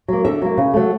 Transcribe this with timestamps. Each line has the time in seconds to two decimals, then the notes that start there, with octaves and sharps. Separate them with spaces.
0.08 F#3 A#3
0.25 D3 E5
0.42 F#3 A#3
0.57 C#3
0.74 F#3 A3